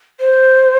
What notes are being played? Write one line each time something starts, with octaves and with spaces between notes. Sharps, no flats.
C5